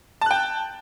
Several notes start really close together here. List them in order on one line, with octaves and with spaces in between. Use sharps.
A5 F#6 G5